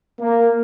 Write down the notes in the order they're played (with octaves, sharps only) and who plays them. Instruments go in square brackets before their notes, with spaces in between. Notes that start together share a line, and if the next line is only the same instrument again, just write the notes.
[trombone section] A#3